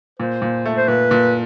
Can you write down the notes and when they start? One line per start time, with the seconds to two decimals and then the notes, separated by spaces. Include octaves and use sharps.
0.19 A#2 C5
0.42 A#2
0.65 A3
0.77 C5
0.88 A#2 B4
1.11 A#2